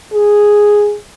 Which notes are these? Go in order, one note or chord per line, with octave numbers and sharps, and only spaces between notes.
G#4